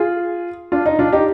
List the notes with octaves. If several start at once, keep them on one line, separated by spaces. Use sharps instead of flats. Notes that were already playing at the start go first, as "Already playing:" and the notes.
Already playing: F4 G#4
D4 F4
D#4
D4 F4
D#4 G4